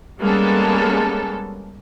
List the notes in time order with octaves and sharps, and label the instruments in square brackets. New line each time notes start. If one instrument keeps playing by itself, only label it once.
[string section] G3 G#3 A#3 B3 C#4 A4